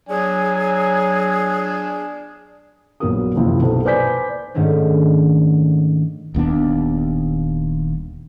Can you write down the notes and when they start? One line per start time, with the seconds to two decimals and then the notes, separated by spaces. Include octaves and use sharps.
0.09 F#3 D4 G#4 G#5
3.00 A#1 F#3 B3 F#4 A#4 D#6
3.35 F#1 D#2 C3 F3 E4
3.62 B1 A4 C5
3.85 B4 C5 D5 G#5 G6 B6
4.54 G#2 D#3 A3 C#4 D4
6.34 D#1 D#2 B3 D4